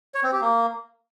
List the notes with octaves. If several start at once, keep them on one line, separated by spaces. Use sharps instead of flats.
C#5
C4
G4
A#3